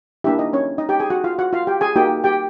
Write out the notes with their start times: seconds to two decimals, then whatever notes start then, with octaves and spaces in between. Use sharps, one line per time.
0.24 A#3 D4 E4 G4 E5
0.39 D#4 D#5
0.53 C#4 C#5
0.78 D#4 D#5
0.89 G4 G5
1.00 G#4 G#5
1.10 F#4 F#5
1.24 F4 F5
1.39 F#4 F#5
1.53 F4 F5
1.67 G4 G5
1.81 G#4 G#5
1.96 A#3 D#4 F#4 G4 G5
2.24 G4 G5